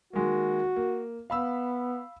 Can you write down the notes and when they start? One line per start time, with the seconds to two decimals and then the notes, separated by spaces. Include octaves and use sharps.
0.13 D#3 G#3 A#3 F#4
0.76 A#3
1.30 B3 F5 B5 E6